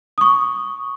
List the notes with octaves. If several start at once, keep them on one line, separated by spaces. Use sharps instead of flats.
C#6 D#6